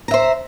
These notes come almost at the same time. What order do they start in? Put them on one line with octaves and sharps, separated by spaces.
A#5 E5 C5